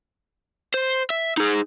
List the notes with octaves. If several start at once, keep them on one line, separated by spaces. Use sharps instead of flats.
C5
E5
D#4 G#4